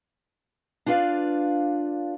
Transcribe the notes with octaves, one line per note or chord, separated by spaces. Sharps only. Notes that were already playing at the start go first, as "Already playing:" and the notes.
D4 F4 B4 D5 F5